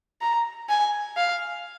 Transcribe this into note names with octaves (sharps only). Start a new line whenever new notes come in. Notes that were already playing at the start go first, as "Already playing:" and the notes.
A#5
G#5
F5